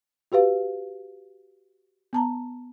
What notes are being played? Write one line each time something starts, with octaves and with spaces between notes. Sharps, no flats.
F#4 G4 B4 F5
B3 A5 A#5